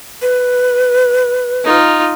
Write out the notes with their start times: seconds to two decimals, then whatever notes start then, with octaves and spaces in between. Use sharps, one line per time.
0.22 B4
1.64 D#4 F4